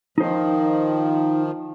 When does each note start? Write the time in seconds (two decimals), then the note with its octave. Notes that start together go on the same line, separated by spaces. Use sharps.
0.18 D#3 F3 D#4 C5